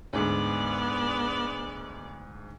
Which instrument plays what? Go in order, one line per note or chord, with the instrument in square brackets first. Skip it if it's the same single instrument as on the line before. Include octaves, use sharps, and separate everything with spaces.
[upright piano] D2 G#2 [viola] B3 D5